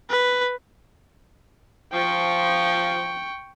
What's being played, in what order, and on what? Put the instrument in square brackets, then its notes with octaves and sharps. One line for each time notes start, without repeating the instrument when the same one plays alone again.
[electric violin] B4
[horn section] F3 [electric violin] G5 C#6